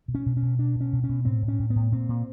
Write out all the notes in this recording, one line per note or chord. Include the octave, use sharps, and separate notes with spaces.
B2
C#4
B2
C#4
B2
B2 D4
B2
C#4
B2
C#4
B2
A2 C4
A2
C#4
A2
B3
A2
A#2 C4
A#2